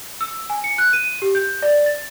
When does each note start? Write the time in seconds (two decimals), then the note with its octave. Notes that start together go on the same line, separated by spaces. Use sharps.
0.21 E6
0.50 G#5
0.64 C#7
0.78 F#6
0.93 D#7
1.22 G4
1.35 G6
1.62 D5
1.86 A6